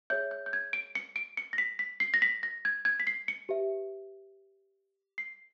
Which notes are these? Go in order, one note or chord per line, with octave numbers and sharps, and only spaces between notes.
G#4 C#5 E5 G6
G6
G6
G#6
D7
C#7
D7
C#7
A#6
B6
B6
C7
A#6
B6
A#6
G#6
G#6
B6
C7
C#7
G4 B4 E5
C7